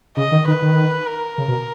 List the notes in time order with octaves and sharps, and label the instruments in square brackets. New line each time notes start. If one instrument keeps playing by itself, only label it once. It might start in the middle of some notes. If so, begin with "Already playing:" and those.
[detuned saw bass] C#3 [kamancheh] D#5
[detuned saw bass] D#3
[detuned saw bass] D#3 [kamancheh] B4
[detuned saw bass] D#3
[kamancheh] A#4
[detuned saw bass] C#3
B2